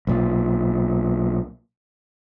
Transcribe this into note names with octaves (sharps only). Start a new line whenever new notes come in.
B1 A#2